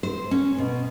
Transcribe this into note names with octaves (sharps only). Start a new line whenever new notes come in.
C5
C#4
B2